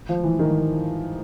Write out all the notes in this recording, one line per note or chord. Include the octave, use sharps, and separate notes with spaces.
F3
E3
D#3